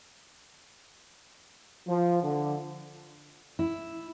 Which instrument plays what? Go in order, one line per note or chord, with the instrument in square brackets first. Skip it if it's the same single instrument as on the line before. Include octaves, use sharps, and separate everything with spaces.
[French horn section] F3
D3
[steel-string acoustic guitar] E4